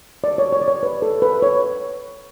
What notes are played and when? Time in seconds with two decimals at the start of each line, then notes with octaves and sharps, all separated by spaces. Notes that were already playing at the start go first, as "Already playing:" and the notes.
0.24 D5
0.38 C#5
0.53 C#5
0.61 D5
0.68 C#5
0.83 B4
1.02 A4
1.22 B4
1.42 C#5